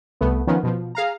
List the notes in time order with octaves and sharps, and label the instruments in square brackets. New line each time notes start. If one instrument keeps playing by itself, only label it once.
[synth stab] C2 A3 B3
D#3 F3 B3 C#4
B2 F3
G#4 F5 A#5